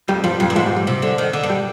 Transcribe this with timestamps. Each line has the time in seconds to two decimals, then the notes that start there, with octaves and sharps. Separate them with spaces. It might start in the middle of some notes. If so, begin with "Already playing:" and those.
0.08 F2 G3
0.24 G2 F3
0.40 F2 G3
0.50 G2
0.55 G#2 F3 G#3
0.66 G3
0.76 G3
0.87 C3
1.02 D3
1.18 D#3
1.33 D3
1.43 G2
1.50 G3